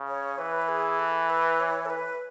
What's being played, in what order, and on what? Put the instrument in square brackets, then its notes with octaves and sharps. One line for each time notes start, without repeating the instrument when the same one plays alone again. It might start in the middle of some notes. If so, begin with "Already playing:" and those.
Already playing: [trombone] C#3
[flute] C#5
[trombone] E3 [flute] B4
[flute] G#4
A4
B4
C#5
A4
B4